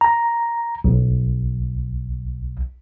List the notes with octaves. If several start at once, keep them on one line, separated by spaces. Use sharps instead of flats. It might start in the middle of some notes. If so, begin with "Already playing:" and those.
A#5
B1